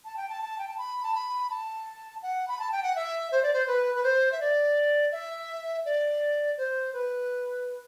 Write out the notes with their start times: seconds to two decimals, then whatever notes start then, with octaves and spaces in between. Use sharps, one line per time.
0.05 A5
0.17 G5
0.29 A5
0.42 A5
0.59 G5
0.68 A5
0.78 B5
1.03 A5
1.15 B5
1.50 A5
2.23 F#5
2.48 B5
2.59 A5
2.72 G5
2.83 F#5
2.96 E5
3.32 C5
3.43 D5
3.53 C5
3.68 B4
3.95 B4
4.04 C5
4.32 E5
4.41 D5
5.12 E5
5.85 D5
6.58 C5
6.93 B4